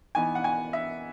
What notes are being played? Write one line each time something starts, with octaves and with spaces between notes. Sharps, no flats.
E3 B3 D#4 G#5
F#5
G#5
E5